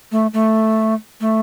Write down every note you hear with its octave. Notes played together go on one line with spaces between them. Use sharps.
A3
A3
A3